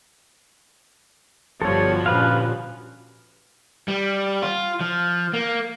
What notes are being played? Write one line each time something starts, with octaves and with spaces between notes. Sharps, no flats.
G1 B2 F3 G3 F#4 A4 C#5
A#2 D3 C#4 B4 F5
G3
F4
F3
A#3